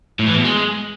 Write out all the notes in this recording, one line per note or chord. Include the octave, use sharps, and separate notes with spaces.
A2
E3
B2
G#3